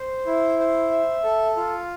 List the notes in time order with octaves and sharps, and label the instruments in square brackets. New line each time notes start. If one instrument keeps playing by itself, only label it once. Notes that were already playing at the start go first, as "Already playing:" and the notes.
Already playing: [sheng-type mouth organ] C5
E4
C5
E5
A4
F4